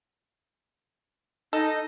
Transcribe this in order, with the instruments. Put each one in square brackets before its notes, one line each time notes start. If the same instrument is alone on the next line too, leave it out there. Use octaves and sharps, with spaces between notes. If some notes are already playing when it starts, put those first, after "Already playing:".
[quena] D#4 [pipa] A4 [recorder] D#5